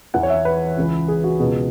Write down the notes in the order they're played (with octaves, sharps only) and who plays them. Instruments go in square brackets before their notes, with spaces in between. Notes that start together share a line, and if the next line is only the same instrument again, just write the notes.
[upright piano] E2 E3 F#5
C#5
E5
B4
C#2 C#3 E3
G#4
F#4
C#2 B2 G#4